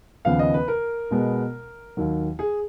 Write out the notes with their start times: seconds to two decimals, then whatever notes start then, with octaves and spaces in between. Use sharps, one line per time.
0.25 D#2 C#3 F3 B3 F5
0.39 D#5
0.54 B4
0.68 A#4
1.11 B2 G#3 B3
1.97 D#2 D#3 F#3
2.39 G#4